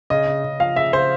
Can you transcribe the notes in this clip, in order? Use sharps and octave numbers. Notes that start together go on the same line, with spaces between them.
C#3 D#5
C#3
C#3
F3 F5
C#3 E5
C#3 C5